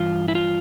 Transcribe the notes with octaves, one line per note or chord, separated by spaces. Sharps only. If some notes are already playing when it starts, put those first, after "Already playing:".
Already playing: G2 E3 F4
E4
F4